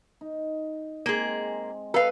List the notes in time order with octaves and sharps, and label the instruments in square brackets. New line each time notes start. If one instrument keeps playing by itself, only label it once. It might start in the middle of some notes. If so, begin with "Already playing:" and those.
[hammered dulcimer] D#4
[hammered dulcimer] G#3 C4 [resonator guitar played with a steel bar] A#3 G#4
[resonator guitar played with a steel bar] A4 F5 [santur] B4